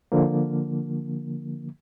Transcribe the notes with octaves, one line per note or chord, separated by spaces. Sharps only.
D3 F3 A#3